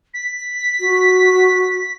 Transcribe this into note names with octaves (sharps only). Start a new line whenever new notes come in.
B6
F#4